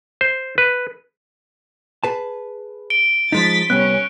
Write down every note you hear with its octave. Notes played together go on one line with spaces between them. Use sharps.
C5
B4
G#4 B4 A5
D7 G7
F3 G#3 D#4 A6 B6
C2 G3 B3 C#4 F#6